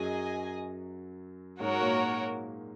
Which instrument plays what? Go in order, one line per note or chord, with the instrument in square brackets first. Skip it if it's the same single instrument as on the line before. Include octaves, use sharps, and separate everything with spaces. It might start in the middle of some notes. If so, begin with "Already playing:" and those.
Already playing: [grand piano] F#2 F#3 [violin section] G#4 D#5 G#5
[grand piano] G#2 G#3 [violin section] F#4 A#4 C#5
[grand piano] A#2 A#3